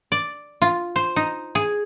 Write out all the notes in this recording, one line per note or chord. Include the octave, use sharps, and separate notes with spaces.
D5
F4
C5
D#4
G#4